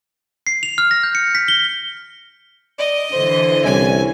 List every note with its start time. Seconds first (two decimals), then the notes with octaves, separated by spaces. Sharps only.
0.47 C7
0.63 F7
0.78 F6
0.91 A#6
1.03 G6
1.15 C#7
1.35 B6
1.48 G7
2.79 D5 D#5
3.13 D3 E3 D4 C5
3.65 C2 C#4 G#5